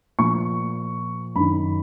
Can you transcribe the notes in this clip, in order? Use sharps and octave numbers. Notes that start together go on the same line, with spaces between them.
A#2 F3 C#6
F#2 D#3 B5